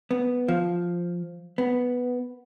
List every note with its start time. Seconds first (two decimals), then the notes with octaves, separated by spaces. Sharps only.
0.11 B3
0.48 F3
1.58 B3